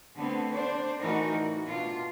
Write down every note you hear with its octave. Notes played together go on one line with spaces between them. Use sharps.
D3 A3 B3 C4
D4 C5 D5
A2 E3 A3 D#4 F#4 A#4
F#4
B2 D4 F4